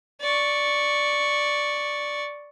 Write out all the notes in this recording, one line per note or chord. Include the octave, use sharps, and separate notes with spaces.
D5 C#6